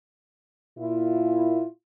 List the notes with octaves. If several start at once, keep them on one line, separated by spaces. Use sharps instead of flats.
A#2 E4 F4